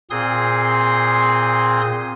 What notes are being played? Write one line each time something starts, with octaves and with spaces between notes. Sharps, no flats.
A#2 C4 G#4 C6 D#6 G6